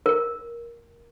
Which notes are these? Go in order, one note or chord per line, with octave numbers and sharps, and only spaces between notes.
A#4